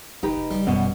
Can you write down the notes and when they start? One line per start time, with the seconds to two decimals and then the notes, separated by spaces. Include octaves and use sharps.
0.23 F#1 D#4 G4 B4
0.37 F1
0.51 F#1 G3
0.67 G1 F#2 B2 B3